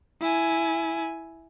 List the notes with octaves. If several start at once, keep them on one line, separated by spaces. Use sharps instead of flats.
E4 G#5